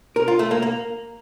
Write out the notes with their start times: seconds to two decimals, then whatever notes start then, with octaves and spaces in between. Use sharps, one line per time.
0.16 A#4
0.28 F4
0.39 A3
0.51 A#3
0.62 A#3